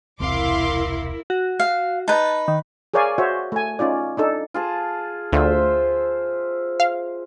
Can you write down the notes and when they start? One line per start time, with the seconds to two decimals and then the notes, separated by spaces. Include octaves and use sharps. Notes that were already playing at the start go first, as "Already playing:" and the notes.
0.20 E1 C2 C4 E4 A#4 F5 C6 D6
1.30 F#4
1.60 F5
2.08 D#4 B4 A5
2.48 D#3
2.94 G#4 A#4 C#5 D5 F5 G#5
3.18 F#4 C5 C#5 E5
3.52 A3 G#5
3.79 C#4 D#4 F4 D5
4.17 D4 D#4 A4
4.54 F4 G#4 A5
5.33 D2 F4 C5 E5
6.80 F5